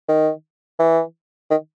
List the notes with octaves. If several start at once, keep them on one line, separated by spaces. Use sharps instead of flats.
D#3
E3
D#3